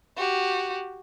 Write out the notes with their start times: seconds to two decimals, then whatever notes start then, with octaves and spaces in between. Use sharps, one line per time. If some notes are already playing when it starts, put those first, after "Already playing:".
0.17 F#4 G4